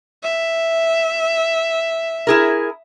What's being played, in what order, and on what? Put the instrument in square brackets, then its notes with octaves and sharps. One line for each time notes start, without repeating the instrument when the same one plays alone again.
[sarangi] E5
[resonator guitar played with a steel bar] E4 G#4 A#4